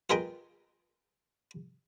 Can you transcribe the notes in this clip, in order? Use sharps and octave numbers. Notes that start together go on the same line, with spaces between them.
F4 G#4 A#4 B4 D#5 G5